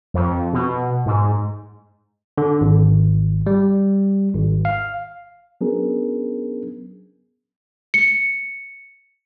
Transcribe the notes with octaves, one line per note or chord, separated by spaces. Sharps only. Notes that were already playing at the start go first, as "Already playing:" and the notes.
F2
B2
G#2
D3
G#1
G3
G#1
F5
F#3 B3 C#4 D4 G#4 A#4
C#7